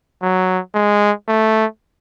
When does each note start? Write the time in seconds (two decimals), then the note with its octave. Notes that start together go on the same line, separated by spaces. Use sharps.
0.22 F#3
0.74 G#3
1.28 A3